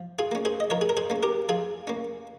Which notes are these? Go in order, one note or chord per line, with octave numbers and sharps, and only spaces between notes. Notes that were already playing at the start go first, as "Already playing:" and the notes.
Already playing: F3
F4 G#4
A#3 C#4
G#4 C5
D#5
F3 A#4 C#5
G#4
A#4
G#4 C5
A#3 C#4
G4 A#4
F3 F4 G#4
A#3 C#4